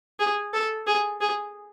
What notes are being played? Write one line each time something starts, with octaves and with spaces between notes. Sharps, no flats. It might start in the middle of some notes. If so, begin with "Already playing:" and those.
G#4
A4
G#4
G#4